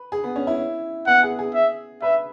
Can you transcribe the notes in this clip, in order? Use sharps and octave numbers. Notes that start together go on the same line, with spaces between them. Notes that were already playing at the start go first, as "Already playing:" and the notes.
Already playing: B4
G#4
B3
C#4
E4
B3 F#5
G#4
G#4
E5
B4 E5